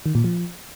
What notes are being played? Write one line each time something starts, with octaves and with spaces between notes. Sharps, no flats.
D#3
A#2
F3